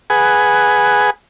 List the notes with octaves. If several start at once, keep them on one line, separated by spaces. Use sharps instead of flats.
G#4 B4 F#5 G#5